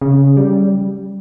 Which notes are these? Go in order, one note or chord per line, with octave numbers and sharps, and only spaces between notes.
C#3
G3